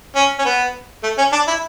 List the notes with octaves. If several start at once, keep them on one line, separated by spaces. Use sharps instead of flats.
C#4
C#4
B3
A3
C#4
D4
E4